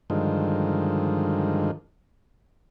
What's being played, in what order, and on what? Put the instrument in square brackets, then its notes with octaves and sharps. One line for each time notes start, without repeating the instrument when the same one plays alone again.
[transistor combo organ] G2 D3 D#3 F3 G#3